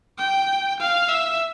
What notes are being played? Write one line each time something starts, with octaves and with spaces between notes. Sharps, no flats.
G5
F5
E5